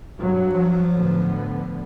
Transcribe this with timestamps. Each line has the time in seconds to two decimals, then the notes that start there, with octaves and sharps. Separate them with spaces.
0.20 G2 F#3
0.53 F3
0.93 A2 D3 B3